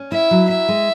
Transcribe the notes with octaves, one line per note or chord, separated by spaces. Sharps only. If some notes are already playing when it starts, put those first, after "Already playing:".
Already playing: C#4
E4 E5
F#3
E4 E5
G#3